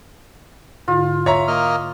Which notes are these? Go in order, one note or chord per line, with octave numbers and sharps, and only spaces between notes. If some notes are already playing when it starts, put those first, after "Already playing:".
G#2 D3 E4 F4
C#5 E5 A#5
A#3 D#5 F6